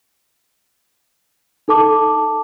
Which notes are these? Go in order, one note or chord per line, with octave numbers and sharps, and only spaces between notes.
D#4 A4 A5 D6